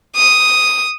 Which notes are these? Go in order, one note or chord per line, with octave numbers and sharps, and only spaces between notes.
D#6